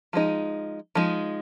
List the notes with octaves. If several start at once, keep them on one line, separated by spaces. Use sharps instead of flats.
F3 G#3 D#4
F3 G#3 D#4